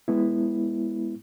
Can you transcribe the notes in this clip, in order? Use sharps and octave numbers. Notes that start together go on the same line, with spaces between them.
G#3 B3 E4